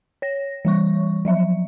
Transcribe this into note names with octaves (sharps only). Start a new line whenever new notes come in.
C#5 A#6
E3 G3 C#6
F3 F#3 E5